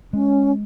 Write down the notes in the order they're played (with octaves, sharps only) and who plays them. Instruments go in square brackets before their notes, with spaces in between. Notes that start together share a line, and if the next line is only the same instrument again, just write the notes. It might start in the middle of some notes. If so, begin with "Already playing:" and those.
[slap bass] G#3 [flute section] C#4